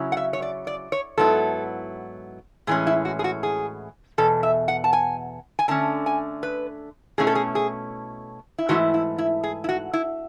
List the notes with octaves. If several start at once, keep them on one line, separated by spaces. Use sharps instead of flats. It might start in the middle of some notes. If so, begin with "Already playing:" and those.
Already playing: C#3 F#3 C#4 E4
F#5
E5
C#5
D5
D5
C#5
G#2 F#3 B3 E4 A4
A2 E3 G#3 C#4 G#4
E4
F#4
G#4
F#4
G#4
E2 B2 A4
E5
F#5
A5
G#5
G#5
D3 A3 C#4 A5
G#5
B4
B2 A3 C#4 E4 G#4
A4
G#4
G#4
E4
G#2 E3 A3 E4 F#4
E4
E4
G#4
E4
F#4
E4